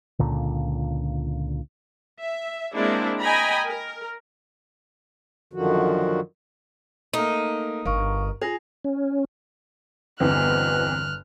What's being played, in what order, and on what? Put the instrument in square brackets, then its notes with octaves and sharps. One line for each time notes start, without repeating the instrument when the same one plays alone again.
[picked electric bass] C#2 A#2 D3
[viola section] E5
G#3 A#3 C4 D4 E4
D#5 G5 G#5 A#5 B5
A#4
[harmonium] F#2 D3 D#3 F3 F#4
[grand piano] A3 A#3 [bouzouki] D#4
[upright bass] G1 [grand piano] A#4 [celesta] F5 C#6
[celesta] F4 A#6 F7 [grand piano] G#4
[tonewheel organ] C#4
[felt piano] G1 [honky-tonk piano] E2 E3 C4 [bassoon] B2 [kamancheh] F6 F#6